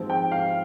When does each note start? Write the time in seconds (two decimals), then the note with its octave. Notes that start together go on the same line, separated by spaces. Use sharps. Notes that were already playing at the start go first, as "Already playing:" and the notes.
Already playing: G#2 F3 C4
0.10 G5
0.32 F5